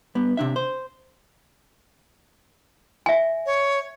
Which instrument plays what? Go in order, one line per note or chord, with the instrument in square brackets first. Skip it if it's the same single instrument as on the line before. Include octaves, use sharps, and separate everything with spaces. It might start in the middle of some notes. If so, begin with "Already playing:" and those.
[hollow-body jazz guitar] G2 B3
C3 D4 E5
C5
[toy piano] E5 G#5
[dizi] C#5